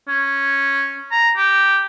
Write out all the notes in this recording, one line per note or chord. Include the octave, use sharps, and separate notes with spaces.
C#4
A#5
G4